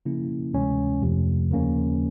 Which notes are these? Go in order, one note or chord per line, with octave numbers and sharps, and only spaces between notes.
C#3 F3 A#3 C#4 E4
D2 C3 E3 G#3 C#4
F2 C3 F3 A3
D#2 C#3 F3 A#3 C#4